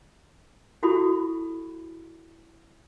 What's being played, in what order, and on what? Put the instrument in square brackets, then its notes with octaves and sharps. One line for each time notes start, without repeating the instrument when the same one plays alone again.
[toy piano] E4 F#4 G4 A4 B5 C#6